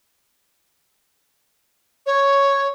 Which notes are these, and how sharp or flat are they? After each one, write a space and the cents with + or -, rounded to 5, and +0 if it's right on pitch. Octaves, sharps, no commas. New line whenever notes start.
C#5 +0